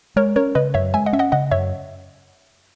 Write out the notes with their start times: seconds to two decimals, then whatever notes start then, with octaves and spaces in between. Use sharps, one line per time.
0.16 G#3 A#4 C#5
0.36 C#4 A#4 C#5
0.55 C#3 B4 D#5
0.74 F#2 C#5 E5
0.94 G#3 E5 G#5
1.06 D#5 F#5
1.13 C#4 E5
1.19 D#5 F#5
1.32 C#3 D#5 F#5
1.51 F#2 C#5 E5